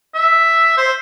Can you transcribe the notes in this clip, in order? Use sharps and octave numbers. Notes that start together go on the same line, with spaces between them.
E5
C5